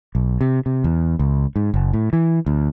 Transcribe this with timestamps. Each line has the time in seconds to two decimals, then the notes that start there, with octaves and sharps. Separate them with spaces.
0.15 B1
0.41 C3
0.66 C3
0.84 E2
1.19 C#2
1.56 G#2
1.74 F#1
1.93 A2
2.13 E3
2.46 D2